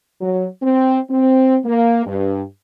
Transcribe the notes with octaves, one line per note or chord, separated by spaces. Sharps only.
F#3
C4
C4
A#3
G2